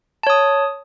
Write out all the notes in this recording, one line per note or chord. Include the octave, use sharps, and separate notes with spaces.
C#5 A5 D#6